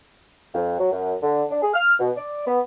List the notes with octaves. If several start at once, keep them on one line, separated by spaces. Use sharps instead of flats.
F2
F#3
F#2
D3
D4
G#4
F6
B2
D5
B3